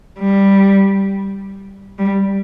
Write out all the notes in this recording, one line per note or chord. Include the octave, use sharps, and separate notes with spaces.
G3
G3